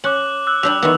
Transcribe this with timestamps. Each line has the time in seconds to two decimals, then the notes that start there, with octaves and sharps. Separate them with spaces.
0.04 C#4 D6 F#6 F#7
0.47 E6 F#6
0.63 G3 D4 G4 E6 F7 F#7
0.83 D#3 E3 B3